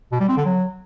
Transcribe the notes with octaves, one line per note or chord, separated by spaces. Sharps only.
B2
G3
C4
D3
F#3